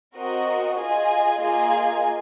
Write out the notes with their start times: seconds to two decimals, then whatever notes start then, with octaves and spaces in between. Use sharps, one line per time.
0.15 C4 F#4 A#4 D#5
0.77 F4 G#4 D#5 G#5
1.39 A#3 F4 G#4 D#5 G#5